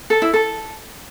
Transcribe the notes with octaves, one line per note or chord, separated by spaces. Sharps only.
A4
E4
A4